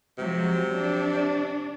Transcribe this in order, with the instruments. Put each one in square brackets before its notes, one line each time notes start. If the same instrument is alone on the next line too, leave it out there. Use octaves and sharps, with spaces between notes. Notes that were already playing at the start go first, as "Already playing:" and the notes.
[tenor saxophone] C3 [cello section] F3 F#3 G#3
[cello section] D4